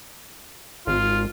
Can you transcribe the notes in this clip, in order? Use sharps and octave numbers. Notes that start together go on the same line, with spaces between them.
G#1 F4